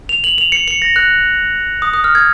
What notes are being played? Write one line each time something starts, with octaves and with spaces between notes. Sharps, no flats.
F7
F#7
F7
C#7
C#7
A#6
F#6
D#6
D#6
F6
G#6